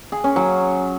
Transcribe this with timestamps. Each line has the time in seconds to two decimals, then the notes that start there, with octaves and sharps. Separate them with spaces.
0.12 G#4
0.24 C#4
0.36 F#3